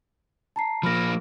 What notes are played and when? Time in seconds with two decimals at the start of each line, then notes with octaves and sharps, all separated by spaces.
0.56 A5 A#5 C7
0.83 F3 A#3 B5 F6 A#6